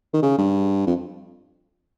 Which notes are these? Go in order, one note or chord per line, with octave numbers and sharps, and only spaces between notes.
D#3
C#3
G2
F2